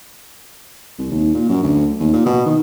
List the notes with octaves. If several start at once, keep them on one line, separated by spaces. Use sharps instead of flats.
C2
D#2
A#2
F#2
D2
D#2
A#2
B2
D#3